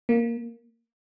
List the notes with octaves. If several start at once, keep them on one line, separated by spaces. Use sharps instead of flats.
A#3